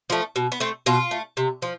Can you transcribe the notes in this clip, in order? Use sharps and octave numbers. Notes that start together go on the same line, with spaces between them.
F3 A3
B2
B3
A3 C4
B2 F4
A3
C3
F3